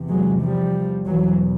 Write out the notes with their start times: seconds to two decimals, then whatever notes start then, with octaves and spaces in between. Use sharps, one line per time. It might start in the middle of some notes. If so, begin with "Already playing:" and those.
Already playing: E2 C3
0.09 F#3 G#3
0.41 F3 G3
1.06 E2 B2 E3 F#3